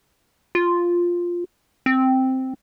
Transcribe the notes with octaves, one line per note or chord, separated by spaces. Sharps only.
F4
C4